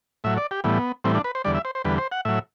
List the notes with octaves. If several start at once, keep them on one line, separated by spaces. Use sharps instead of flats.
A2 F#3 E5
D5
G4
A2 E3 G3 B3
A2 E3 G3 C4
D4
B4
C5
E2 D3 G3 D5
E5
C5
C5
E2 D3 G3 B4
C5
F#5
A2 F#3 E5